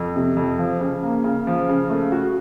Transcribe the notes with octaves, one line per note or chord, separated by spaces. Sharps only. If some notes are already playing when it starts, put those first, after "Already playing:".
Already playing: F2
C3
F2
F3
C#3
A#3
C#3
F3
C#3
A3
F#4